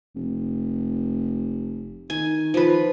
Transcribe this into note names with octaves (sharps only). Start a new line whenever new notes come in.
F1
D#3 G#5
F3 B4